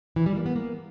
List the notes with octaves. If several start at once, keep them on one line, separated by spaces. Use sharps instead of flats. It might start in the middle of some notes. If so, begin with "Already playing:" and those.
E3
G3
A#3
B3
A#3